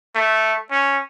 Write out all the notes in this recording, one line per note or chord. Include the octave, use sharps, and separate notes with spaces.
A3
C#4